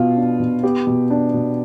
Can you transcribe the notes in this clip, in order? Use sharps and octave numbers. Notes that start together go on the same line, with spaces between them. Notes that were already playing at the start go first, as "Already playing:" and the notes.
Already playing: B2 B3 F4
D4
B2
B3 G4
B2
D4
B2